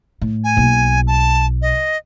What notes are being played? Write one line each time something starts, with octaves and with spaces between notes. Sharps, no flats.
A2
G#5
B1 A#3
A5
D#5